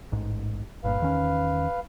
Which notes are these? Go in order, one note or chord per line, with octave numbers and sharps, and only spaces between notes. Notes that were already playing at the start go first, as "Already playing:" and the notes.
A1 G#2
G1 G2 A#2 B4 F5
E2 D#3 C#4